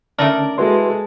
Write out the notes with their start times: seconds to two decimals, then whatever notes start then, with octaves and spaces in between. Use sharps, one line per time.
0.19 D3 A3 C#4 D#4 A#4 D5 A5
0.58 E3 G#3 F#4 A4 B4 C6